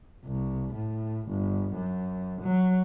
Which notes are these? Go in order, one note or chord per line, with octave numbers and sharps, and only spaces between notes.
C2
A2
G1
F#2
F#3